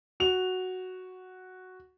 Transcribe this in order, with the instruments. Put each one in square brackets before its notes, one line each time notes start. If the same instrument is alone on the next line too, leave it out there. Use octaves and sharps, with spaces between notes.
[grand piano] F#4 F7